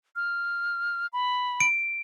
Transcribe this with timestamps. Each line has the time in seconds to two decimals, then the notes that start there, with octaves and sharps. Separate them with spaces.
0.16 F6
1.13 B5
1.60 D7